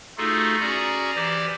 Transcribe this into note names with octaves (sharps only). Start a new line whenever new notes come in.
A3 D#4 F4 F#4 G#4 A4
C#4 F#4 G#4 D5 A#5
E3 G4 C5 D5